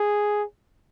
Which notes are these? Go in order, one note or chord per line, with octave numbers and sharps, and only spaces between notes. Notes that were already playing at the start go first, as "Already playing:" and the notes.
Already playing: G#4